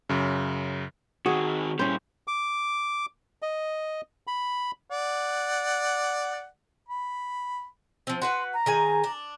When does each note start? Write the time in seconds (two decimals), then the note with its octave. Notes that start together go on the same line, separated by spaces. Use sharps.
0.09 F#2 C#3
1.26 D#3 C4 F#4 G#4
1.79 A#2 G3 C#4 E4 C5
2.28 D6
3.42 D#5
4.27 B5
4.91 D5 F#5
6.89 B5
8.07 F3 C4
8.22 F#4 B4 F#5 C6
8.54 A#5
8.66 D#3 G#4 G#5
9.04 D4